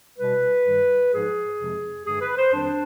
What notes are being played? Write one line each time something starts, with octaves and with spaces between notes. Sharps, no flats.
B2 G3 B4
G2 D#3 G3
G#2 F3 G#3 G#4
F2 C3 F3 G#3
G2 D3 G#3 G#4
B4
C5
F2 D#3 G3 D4